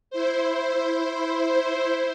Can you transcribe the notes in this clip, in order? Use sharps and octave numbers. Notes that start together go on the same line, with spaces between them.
E4 C5